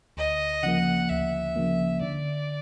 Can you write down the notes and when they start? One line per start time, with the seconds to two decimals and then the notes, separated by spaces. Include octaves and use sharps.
0.17 D2 D#5
0.63 C#3 F3 A#3 F#5
1.09 D2 E5
1.56 C#3 F3 A#3
2.01 D3 D5